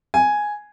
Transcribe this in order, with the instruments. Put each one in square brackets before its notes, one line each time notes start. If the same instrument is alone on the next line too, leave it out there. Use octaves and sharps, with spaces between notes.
[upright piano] G#5